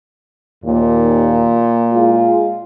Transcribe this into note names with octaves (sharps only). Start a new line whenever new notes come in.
D#2 A#2
G#3 F4